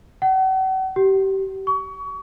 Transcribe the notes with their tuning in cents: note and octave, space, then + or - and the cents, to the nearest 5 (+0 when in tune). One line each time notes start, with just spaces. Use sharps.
F#5 +40
G4 -25
C#6 +30